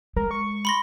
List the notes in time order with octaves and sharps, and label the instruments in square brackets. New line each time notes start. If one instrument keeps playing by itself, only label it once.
[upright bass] G#3 [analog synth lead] A#4
[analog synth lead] C#6
[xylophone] B5 C6 A#6